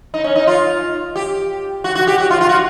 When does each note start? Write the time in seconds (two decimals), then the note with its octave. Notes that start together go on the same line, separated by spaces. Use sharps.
0.14 D#4
0.24 C#4
0.36 D#4
0.47 F4
1.16 G4
1.84 F#4
1.95 F#4
2.07 G4
2.18 F#4
2.31 F4
2.41 F4
2.49 F#4